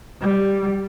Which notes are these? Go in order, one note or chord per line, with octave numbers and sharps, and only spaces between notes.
G3